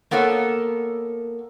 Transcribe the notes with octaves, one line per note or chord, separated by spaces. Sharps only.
A#3 B3 A4 A#4 C#5